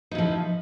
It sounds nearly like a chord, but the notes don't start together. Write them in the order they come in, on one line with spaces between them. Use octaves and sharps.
D#4 E4 F3